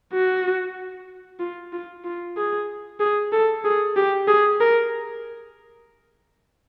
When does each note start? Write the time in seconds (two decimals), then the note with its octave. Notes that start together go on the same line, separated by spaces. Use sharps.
0.13 F#4
1.40 F4
1.73 F4
2.05 F4
2.37 G#4
3.00 G#4
3.33 A4
3.65 G#4
3.96 G4
4.28 G#4
4.60 A#4